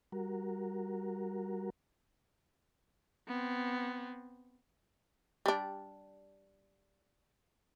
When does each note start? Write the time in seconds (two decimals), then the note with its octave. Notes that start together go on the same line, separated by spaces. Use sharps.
0.12 G3 F#4 A#4
3.28 B3 C4
5.46 G3 D4